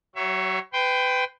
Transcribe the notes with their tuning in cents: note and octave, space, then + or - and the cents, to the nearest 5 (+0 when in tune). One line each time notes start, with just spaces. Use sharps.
F#3 +35 C#5 +0 E5 +25
B4 +30 G5 +0 C6 +0